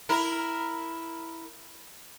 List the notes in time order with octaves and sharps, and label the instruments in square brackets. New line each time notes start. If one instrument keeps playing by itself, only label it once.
[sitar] E4 A#4